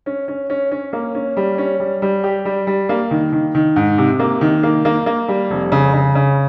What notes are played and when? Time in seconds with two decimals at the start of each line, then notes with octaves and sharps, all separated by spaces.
0.06 C#4
0.28 C#4
0.50 C#4
0.71 C#4
0.93 A#3
1.15 C#4
1.37 G3
1.58 C#4
1.80 G3
2.02 G3
2.24 G4
2.45 G3
2.67 G3
2.89 A#3
3.11 D#3
3.32 D#3
3.55 D#3
3.76 G#2
3.98 C3
4.19 A#3
4.41 D#3
4.63 A#3
4.85 A#3
5.06 A#3
5.28 G3
5.50 F1
5.72 C#3
5.94 C#3
6.15 C#3